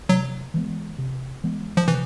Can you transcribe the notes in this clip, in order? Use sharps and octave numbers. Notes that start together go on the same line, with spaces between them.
C3 F#3
E3 G#3 B3
C3
E3 G#3 B3
F3
C3 E3